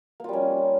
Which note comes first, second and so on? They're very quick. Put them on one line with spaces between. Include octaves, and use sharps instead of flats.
A#3 F4 G3 C#4